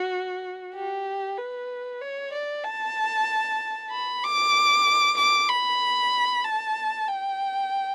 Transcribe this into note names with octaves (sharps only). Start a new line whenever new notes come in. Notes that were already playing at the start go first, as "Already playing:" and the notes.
Already playing: F#4
G4
B4
C#5
D5
A5
B5
D6
D6
B5
A5
G5